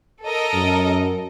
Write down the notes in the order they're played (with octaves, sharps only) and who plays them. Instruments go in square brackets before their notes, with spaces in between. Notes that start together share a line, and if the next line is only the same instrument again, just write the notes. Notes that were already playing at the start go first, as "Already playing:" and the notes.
[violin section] A4 A#4 D#5
[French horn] F#2